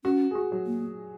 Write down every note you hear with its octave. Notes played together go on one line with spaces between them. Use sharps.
C#4 F#4
G#4
F#4
F#3
A#3